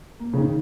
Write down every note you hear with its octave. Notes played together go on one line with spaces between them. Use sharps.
A#3
C#3
D#3